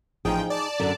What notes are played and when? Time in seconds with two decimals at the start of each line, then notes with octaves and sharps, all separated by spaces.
0.25 A1 F3 D#4 G#4 G5
0.50 D5 A5
0.80 F#2 D3